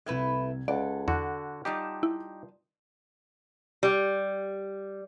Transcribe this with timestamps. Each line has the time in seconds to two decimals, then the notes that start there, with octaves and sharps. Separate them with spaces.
0.06 C2 A3 E4 B4 G#6
0.68 C#2 A4 D5 F#5
1.08 E2 D3 F#4
1.65 G3 D#4 F4 G4 A5
2.03 E4
3.83 G3